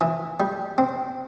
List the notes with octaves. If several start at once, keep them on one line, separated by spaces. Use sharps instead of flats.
E3
G3
C4